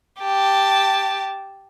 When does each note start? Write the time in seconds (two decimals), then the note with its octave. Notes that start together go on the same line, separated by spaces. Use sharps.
0.21 G4 A5